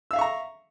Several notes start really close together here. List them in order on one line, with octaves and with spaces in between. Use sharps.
E6 F5 E5 C#6 A#5